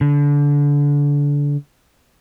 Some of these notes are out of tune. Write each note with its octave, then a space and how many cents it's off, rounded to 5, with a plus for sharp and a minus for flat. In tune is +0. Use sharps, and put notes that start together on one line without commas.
D3 -25